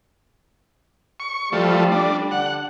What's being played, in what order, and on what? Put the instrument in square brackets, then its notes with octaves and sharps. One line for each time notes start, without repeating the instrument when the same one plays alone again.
[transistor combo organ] C#6
[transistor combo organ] F3 A3 [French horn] G3
[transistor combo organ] D4
[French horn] D3 [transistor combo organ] F#5